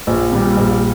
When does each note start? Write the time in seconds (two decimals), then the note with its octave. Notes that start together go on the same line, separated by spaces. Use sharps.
0.07 A#1
0.32 A#2 G3
0.57 A#1